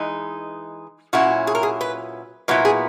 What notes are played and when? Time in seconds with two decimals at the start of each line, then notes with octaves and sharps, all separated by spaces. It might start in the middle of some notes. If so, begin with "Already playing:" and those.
Already playing: E3 G#3 D#4
1.13 A#2 F#3 C#4 E4 F#4
1.47 G#4
1.55 A#4
1.63 G#4
1.81 B4
2.48 A#2 F#3 B3 E4 B4
2.65 G#4